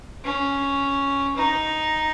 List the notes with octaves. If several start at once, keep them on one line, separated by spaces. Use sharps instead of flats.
C#4
D#4